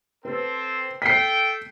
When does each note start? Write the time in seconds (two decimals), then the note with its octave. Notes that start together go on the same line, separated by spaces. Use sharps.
0.25 C4 A4 B4 C5
1.02 A4 G5 B6 C7